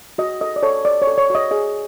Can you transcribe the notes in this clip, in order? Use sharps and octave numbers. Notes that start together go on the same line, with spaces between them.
F#4 D#5
A4 D#5
D5
A4 C#5
C#5 D5
C#5
A4
C#5
F#4 D#5
G#4 D#5